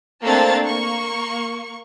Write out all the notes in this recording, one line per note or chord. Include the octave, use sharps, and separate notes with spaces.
A3 A#3 C4 D4 A5 A6
A#3 C#6